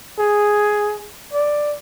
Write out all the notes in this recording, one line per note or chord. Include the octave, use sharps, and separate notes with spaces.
G#4
D5